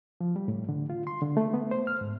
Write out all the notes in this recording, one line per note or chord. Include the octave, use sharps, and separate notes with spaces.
F3
G3
A2
D3
F4
C6
D3
A3
B3
C5
F6
G#2